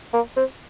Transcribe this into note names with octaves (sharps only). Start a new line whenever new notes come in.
A#3
C4